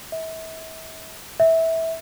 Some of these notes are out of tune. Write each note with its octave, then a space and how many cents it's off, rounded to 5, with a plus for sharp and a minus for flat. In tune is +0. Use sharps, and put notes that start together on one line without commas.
E5 -35
E5 -15